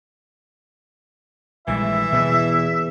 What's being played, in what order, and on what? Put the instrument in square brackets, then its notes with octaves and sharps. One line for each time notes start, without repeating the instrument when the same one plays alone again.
[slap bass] A#1 G3 G#3 [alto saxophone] E3 [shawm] E5
[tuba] E2 [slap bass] B2 B3